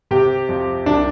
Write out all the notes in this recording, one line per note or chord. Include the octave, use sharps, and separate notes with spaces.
C3 G4
F2
C2 D4